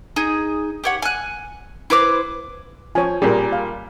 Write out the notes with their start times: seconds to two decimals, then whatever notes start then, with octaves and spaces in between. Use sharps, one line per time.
0.16 D#4 G#4
0.84 G4 C#5 F#5
1.02 G#5 F#6
1.90 E4 B4 C5 D6
2.95 F3 C#5 G#5
3.22 A#2 G3 G#4 A#4
3.52 F5